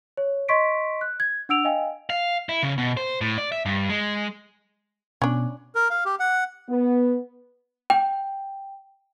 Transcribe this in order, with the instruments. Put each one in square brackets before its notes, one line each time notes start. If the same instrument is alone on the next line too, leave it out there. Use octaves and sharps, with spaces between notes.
[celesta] C#5
D#5 C6 C#6 B6 D7
F#6
G#6
D4 F#5 E6 D7 F7
D#5 F5 G5 G#5
[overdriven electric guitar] F5
E4
C#3
B2
C5
A2
D5
E5
G2
G#3
[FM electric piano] B2 [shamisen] C#4 D4
[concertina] A#4
F5
G4
F#5
[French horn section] B3
[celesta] G5